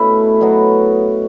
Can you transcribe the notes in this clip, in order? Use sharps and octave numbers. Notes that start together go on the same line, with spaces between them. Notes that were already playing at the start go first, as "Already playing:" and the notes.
Already playing: B2 A3 C#4 E4 B4
B2 F#3 B3 F#4